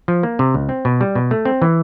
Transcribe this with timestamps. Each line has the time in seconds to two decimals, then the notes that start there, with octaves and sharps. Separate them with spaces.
0.08 F3
0.23 A#3
0.39 C3
0.54 C#2
0.69 C4
0.85 B2
1.01 G3
1.15 B2
1.31 A3
1.45 C4
1.62 E3